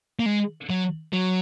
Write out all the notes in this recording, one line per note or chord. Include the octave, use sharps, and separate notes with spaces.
A#3
G#3
F#3
F#3